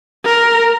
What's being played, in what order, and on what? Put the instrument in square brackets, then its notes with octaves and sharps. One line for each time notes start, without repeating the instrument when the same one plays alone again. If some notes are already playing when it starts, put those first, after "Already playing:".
[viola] A#4